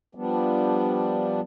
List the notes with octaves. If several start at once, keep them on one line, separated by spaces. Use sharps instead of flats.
F3 G3 B3 D4